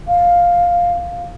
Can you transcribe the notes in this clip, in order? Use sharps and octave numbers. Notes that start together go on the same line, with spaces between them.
F5